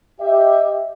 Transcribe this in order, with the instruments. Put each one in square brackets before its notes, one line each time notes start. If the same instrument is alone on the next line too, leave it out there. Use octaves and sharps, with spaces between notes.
[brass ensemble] G4 D#5 E5